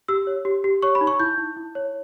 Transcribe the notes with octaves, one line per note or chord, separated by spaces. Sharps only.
G4 E6
C#5
G4
G4
C#5 C#6
B5
D#4
C#6
E4 G6
E4
E4
C#5